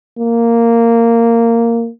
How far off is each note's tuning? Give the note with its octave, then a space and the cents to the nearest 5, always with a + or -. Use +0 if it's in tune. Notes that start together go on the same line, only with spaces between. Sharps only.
A#3 -10